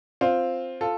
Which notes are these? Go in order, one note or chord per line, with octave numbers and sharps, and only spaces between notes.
C4 F4
F4 A4